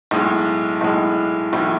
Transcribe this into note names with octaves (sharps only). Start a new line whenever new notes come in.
B1 A2 G#3
B1 A2 G#3
B1 A2 E3